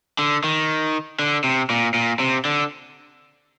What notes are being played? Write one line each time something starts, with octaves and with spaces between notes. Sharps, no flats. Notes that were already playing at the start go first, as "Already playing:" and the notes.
D3
D#3
D3
C3
A#2
A#2
C3
D3